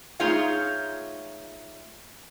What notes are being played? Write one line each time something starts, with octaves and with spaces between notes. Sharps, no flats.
A3 D#4 F4 G#4 C#5 F5